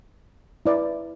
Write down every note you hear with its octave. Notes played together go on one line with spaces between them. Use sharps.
E4 B4 D5